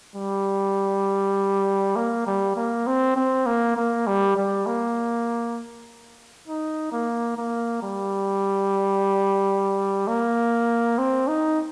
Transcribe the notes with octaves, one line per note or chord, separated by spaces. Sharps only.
G3
A#3
G3
A#3
C4
C4
A#3
A#3
G3
G3
A#3
D#4
A#3
A#3
G3
A#3
C4
D#4